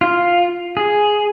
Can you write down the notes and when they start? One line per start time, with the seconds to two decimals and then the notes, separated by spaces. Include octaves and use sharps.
0.01 F4
0.77 G#4